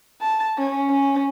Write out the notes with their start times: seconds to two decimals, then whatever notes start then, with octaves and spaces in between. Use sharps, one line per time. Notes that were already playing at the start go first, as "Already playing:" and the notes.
0.21 A5
0.58 C#4
0.90 C#4